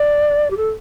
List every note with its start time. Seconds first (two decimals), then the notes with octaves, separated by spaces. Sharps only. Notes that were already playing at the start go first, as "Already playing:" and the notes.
Already playing: D5
0.50 G4
0.57 A4